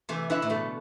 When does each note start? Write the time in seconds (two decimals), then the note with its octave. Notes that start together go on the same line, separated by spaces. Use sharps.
0.09 C3 E3 A3
0.30 D3 E4 B4 E5
0.42 A2
0.50 B2 A3